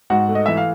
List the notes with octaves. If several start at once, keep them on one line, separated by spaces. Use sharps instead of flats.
G#2 F#4 F#5
A3
D#5
E3 E5
F5